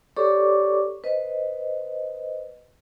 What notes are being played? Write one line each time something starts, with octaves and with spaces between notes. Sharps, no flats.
G4 A4 C#5 D5 C#6 D6
B4 C5 D#5